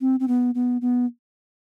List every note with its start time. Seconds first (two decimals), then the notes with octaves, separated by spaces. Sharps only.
0.01 C4
0.20 C4
0.28 B3
0.55 B3
0.81 B3